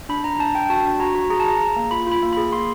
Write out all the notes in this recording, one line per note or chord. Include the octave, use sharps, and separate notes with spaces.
D4 B5
D4 A#5
D4 A5
D4 G5
F#4 A5
D4
F#4 A#5
F#4
G#4 A#5
A5
G#4 A#5
G#4
A#3
F4 B5
F4 B5
A#3
G#4 B5
A#3 C6